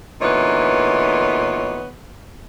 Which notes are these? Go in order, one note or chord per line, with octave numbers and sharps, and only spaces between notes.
D2 A#2 E3 B3 D#4 C#5